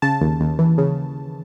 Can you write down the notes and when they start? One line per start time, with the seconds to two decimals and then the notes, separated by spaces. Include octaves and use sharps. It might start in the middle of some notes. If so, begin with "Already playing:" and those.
0.02 C#3 A5
0.21 D#2
0.40 D#2
0.59 E3
0.78 C#3